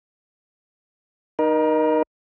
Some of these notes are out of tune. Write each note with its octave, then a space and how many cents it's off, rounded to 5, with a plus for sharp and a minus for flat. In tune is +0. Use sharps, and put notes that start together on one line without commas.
D#4 -15 A#4 +30